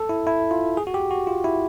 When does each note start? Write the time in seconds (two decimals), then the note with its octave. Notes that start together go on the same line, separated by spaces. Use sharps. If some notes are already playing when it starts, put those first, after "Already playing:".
Already playing: A4
0.09 E4
0.27 E4
0.51 F4
0.77 G#4
0.87 F#4
0.94 G4
1.11 F#4
1.27 F4
1.44 E4